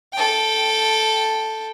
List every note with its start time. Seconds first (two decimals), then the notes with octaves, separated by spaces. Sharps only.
0.13 A4 G5